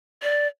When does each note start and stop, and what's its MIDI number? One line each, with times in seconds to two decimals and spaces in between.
0.22 0.47 74